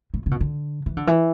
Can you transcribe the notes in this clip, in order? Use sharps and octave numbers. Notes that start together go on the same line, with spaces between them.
A2
C#3
B2
D3
E3
D3
E3